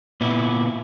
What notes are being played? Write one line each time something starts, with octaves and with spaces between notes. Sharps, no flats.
A#2 B3 E4